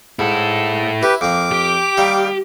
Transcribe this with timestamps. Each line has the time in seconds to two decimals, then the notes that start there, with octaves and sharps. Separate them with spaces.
0.19 G#2 E4 A4
1.03 E4 G4 B4
1.21 F2 A#3 D6
1.51 G4
1.97 D#3 G3 A#3